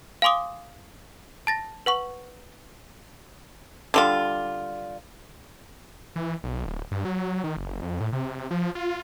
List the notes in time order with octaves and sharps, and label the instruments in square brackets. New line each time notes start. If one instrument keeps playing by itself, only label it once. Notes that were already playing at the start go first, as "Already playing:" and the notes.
[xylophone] F5 G#5 C6 D6 D#6
A5 A6 A#6
B4 F#5 C#6
[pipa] D3 G3 F4
[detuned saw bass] E3
B1
D1
G2
F#3
D#3
F#1
F2
A2
C3
F3
F4